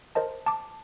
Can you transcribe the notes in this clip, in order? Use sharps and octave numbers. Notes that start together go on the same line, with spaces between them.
A#4 C5 D#5 A5
A5 D6